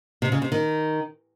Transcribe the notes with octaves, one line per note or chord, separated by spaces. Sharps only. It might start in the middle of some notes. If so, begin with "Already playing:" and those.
C3
C#3
C3
D#3